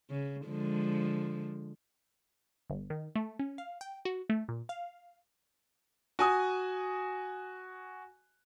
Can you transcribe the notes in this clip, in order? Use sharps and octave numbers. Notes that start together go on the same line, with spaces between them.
C#3
D3 F3 G#3
G1
D#3
A3
C#4
F5
G5
F#4
A3
A#2
F5
F#4 G#5 D#6